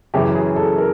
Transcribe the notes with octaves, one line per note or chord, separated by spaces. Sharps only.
F#2 C#3 E3 G4
G#4
A4
A#4